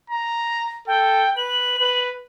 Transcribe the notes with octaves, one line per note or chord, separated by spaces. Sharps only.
A#5
A4 G5
B4 F#7
B4